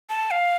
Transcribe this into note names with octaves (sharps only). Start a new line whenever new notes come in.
A5
F5